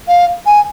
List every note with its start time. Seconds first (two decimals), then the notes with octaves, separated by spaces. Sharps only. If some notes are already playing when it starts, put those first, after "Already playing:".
0.08 F5
0.46 G#5